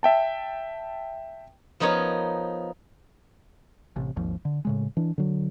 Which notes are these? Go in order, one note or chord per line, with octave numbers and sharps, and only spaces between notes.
E5 G5 A5
F3 B3 D#4 A#4 C#5
A1 C3
G#1 D#2 G#2 F3
D3
A2 C#3 G#3
E3 D4
D3 F#3